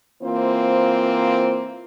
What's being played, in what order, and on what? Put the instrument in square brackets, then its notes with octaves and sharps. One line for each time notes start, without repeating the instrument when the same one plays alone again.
[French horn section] E3 A#3 C4 F4 C5